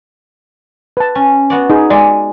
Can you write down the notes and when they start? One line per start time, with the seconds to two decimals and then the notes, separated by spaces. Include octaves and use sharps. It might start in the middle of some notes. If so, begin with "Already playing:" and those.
0.97 B4 A5
1.15 C#4
1.50 B3 F#4 D5
1.70 D#4 G#4
1.90 G#3 D5